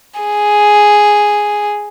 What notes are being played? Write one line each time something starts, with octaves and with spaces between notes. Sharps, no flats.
G#4